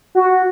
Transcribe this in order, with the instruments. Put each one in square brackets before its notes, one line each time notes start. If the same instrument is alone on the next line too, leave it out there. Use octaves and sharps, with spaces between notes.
[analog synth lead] F#4